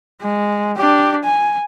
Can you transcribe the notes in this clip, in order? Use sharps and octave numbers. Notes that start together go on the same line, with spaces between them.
G#3
D4 G4
G#5